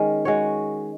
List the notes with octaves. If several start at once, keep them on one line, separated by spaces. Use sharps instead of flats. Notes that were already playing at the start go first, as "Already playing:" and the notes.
Already playing: D#3 G#3 C#4
G#3 F#4 C#5